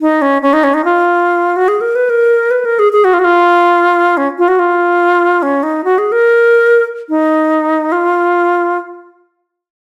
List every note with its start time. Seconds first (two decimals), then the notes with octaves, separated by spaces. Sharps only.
0.01 D#4
0.22 C#4
0.42 C#4
0.53 D#4
0.64 C#4
0.74 D#4
0.85 F4
1.56 F#4
1.68 G#4
1.81 A#4
1.95 B4
2.09 A#4
2.51 B4
2.65 A#4
2.79 G#4
2.92 G#4
3.04 F#4
3.13 F4
3.19 F#4
3.24 F4
4.17 C#4
4.38 F4
4.48 F#4
4.59 F4
5.42 C#4
5.63 D#4
5.84 F#4
5.98 G#4
6.12 A#4
7.09 D#4
7.92 F4